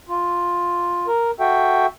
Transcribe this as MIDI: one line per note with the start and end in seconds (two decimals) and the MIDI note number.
0.09 1.07 65
1.07 1.31 70
1.40 1.86 66
1.40 1.86 69
1.40 1.86 76
1.40 1.86 79